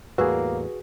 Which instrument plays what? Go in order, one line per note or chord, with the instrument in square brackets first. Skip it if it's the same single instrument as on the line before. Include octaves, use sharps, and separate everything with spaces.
[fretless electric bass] E2 A2 G3 [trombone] A#3 [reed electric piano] F#4 G#4 [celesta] B4